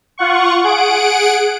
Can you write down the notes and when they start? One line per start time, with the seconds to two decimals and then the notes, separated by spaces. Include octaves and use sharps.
0.18 F4 F#5 C#6
0.64 G#4 F#5 D7